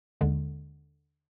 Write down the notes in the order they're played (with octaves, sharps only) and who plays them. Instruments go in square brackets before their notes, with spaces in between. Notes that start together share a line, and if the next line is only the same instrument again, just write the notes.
[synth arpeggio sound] D#2 D3 G#3